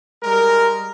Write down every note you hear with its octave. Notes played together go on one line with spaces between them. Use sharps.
G3 G#3 A#4